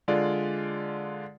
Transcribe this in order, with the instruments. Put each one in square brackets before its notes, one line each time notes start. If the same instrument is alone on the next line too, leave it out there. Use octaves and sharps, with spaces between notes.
[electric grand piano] D3 G#3 F4 D5